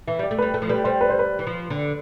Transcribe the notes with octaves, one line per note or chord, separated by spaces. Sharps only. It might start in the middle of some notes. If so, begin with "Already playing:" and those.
E3 E5
G3 D5
A3
G3 B4
A3 A4
F3
G3 B4
G3 C5
B4
C5
B4
E3
F3
D3